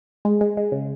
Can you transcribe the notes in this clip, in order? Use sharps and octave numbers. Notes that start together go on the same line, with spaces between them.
G#3
G#3
G#3
C#3